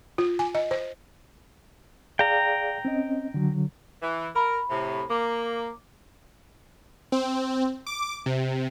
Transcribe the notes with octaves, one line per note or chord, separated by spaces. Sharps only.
F4
G#5
D#5
C5
G#4 D5 F5 G5 A#5
C4 C#4 D#5
D3 F#3
E3
A#4 B5
A2 C3
A#3 D6
C4
D6
C3